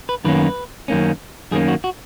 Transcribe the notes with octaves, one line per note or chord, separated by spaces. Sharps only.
B4
F#2 D#3 A#3 C#4 B4
F#2 D#3 A#3 C#4
F#2 D#3 A#3 C#4 G#4
F#4
F#4